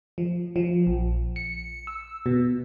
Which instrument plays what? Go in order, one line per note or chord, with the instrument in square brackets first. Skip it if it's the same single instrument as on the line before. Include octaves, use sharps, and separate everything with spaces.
[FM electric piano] F3
F3
A#1
C#7
E6
B2